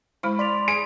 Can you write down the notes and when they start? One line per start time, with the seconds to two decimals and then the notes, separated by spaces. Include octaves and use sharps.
0.23 G#3 E4 C5 B5
0.39 D5 C6 B6 F7
0.68 G#4 D7